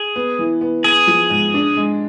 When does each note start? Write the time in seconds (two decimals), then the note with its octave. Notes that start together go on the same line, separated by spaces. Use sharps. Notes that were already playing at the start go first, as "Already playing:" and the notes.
Already playing: G#4
0.16 B3
0.39 E3
0.61 B3
0.84 B3 G#4
1.07 F3
1.30 G#2
1.54 D4
1.77 G#3